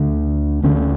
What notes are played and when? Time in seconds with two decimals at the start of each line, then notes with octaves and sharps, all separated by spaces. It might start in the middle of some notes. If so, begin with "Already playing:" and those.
Already playing: D2 D3
0.64 D2 D3 C#4